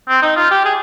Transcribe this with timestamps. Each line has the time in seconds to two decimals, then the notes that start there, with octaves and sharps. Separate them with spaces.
0.09 C4
0.22 D#4
0.37 F4
0.51 G4
0.65 G#4